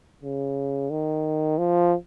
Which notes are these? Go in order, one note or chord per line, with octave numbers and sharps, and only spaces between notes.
C#3
D#3
F3